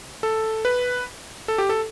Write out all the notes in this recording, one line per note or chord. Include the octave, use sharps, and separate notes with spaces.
A4
B4
A4
G4
A4